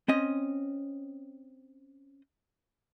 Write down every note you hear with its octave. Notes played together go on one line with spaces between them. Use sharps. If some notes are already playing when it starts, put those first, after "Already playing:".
C4 C#4 D#5